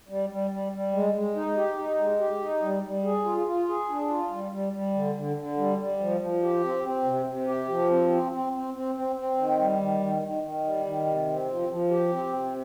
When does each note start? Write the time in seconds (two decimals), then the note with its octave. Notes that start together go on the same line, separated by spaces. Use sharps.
0.09 G3
0.30 G3
0.51 G3
0.72 G3
0.93 G#3
1.14 G#3
1.36 D#4
1.57 G4
1.78 D#4
1.99 G#3
2.19 G4
2.41 D#4
2.62 G3
2.83 G3
3.04 G#4
3.25 F4
3.47 F4
3.68 G#4
3.89 D4
4.09 F4
4.30 G3
4.52 G3
4.73 G3
4.94 D3
5.15 D3
5.37 D3
5.57 G3
5.78 G3
6.00 F3
6.21 F3
6.43 G4
6.64 C4
6.84 C4
7.05 C3
7.26 C3
7.47 G4
7.68 F3
7.90 C4
8.10 C4
8.32 C4
8.53 C4
8.74 C4
8.95 C4
9.16 C4
9.38 D#3
9.59 G3
9.79 D#3
10.00 D#3
10.22 D#3
10.43 D#3
10.65 G3
10.85 D#3
11.06 C3
11.27 C4
11.48 F3
11.69 F3
11.90 G4
12.12 C4
12.33 C3